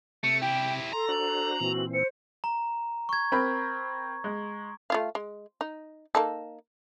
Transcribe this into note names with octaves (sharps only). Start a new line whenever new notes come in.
C3 A3 C#7
E4 G4 G5
A4 A#5 C6
D4 F#4 C5 F#7
A#2 E3 C4 F#4
C5 C#7
A#5
C#6 G#6
C4 A#4 B5
G#3
A3 F4 F5
G#3
D#4
A#3 D#4 A4